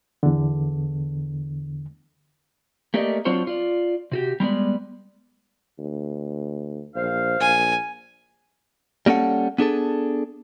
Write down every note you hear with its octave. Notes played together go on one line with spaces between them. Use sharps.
E2 D3
A3 A#3 G4 A#4 D5 D#5
F#3 C4 D4 F4 C5 C#5
F4 D5
C3 F#4 G4
G3 G#3 B3 D5
D2
A#1 C5 F5
A#1 G#5
G3 A#3 C#4 A4 F#5
B3 D4 G#4 A4